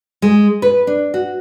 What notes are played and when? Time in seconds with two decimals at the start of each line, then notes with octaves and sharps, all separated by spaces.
0.22 G#3
0.62 B4
0.87 D4
1.14 F#4